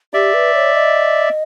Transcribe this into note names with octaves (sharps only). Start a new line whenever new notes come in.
G4 D5 E5
B4
C#5
D#5